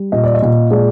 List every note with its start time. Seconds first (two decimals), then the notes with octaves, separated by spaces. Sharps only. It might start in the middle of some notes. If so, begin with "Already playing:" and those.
Already playing: G3
0.12 A#2 D#5
0.24 D5
0.34 D#5
0.42 A#2
0.71 G#3 D5